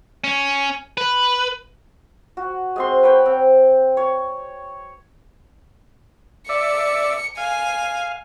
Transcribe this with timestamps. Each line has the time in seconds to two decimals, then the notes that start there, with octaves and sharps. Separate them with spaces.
0.24 C#4
0.97 B4
2.37 F#4
2.76 G#3 C4 C6
3.03 B4 C#5 G5
3.26 C4
3.97 C#5
6.49 D5 E5 C#7
7.37 F5 G#5